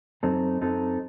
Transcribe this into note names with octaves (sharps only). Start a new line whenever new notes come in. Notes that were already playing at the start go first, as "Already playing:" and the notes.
F#2 F#3 C4 D#4 A4
F#2 F#3 C4 D#4 A4